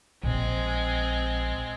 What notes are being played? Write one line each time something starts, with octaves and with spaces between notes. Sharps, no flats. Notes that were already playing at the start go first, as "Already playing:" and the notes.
A#1 G#3 C4